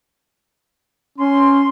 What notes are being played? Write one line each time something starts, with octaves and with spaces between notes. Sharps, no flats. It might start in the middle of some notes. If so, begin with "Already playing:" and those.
C#4 C6